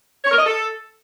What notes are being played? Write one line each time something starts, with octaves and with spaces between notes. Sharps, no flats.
C#5
A#4
D#5
A4